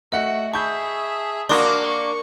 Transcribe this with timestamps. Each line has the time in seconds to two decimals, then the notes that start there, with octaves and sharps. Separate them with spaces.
0.12 A3 F#4 D#5 E5 F#5
0.54 G#4 E5 A5 B5 C#6 G6
1.49 A#3 D4 F#4 A#4 C6 C#6 D#6
1.84 A#4 C#6